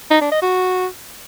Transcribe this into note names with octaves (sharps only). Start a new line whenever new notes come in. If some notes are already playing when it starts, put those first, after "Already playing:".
D#4
D4
D#5
F#4